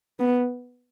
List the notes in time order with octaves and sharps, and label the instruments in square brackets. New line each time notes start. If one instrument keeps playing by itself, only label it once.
[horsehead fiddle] B3